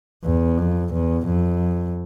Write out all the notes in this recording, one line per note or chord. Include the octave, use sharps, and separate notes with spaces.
E2
F2
E2
F2